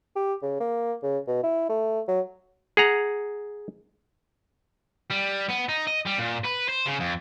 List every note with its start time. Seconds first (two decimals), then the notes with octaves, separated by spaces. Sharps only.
0.16 G4
0.42 C#3
0.60 A#3
1.03 C#3
1.27 B2
1.43 E4
1.69 A3
2.08 F#3
2.77 G#4 F#5 A#5
5.11 G3
5.50 B3
5.69 D#4
5.87 D#5
6.05 G3
6.18 A#2
6.44 B4
6.68 C5
6.86 C#3
7.00 F2